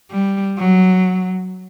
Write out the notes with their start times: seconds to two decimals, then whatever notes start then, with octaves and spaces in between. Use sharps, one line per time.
0.11 G3
0.58 F#3